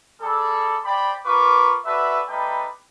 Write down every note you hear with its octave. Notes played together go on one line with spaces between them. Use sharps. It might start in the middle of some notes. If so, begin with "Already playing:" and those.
G3 G#4 A4
C5 D5 G5 B5
F4 A#4 B4 C#6 D6
F#4 A4 B4 D5 E5
G3 A3 D#4 B4 G5